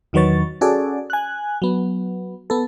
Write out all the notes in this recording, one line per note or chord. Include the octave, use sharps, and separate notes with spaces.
E2 D#3 F#3 B4 C#5 A6
C#4 F#4 G#4 A4 D5
G#5 F#6
F#3 B3
B3 A4